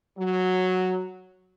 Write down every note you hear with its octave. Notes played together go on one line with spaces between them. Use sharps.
F#3